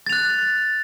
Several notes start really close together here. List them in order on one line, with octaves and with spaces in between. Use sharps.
A6 F7 F#6